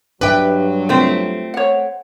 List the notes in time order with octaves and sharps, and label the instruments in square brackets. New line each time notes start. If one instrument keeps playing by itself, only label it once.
[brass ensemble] G2 F#3 [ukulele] D4 E5 [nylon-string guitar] B4 G5
[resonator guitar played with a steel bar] A3 C4 [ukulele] F4
[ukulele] C#5 F#5